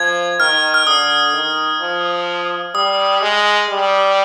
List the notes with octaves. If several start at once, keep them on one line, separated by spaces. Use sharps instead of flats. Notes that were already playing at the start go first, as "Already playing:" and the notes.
Already playing: F3 G#6
D#3 F6
F6
D3 D#6
D#3
F3
G3 D#6
G#3
G3